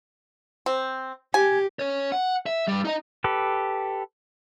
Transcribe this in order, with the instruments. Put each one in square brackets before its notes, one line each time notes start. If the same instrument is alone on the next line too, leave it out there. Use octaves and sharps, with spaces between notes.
[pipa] C4
[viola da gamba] G4 [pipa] G#5
[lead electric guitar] C#4 C#5
F#5
E5
G2 G3
D#4 D#5
[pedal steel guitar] G4 A4 B4